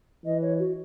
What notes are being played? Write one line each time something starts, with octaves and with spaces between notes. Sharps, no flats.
E3 D#5
C#5
F#4